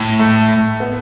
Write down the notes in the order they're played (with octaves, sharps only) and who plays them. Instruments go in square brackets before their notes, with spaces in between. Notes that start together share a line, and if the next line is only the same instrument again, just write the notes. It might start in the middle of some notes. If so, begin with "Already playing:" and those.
Already playing: [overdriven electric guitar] A2
[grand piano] A3
B3